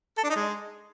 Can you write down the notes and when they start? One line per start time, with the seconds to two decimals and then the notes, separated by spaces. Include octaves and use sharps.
0.18 A4
0.24 D4
0.30 D#4
0.36 G#3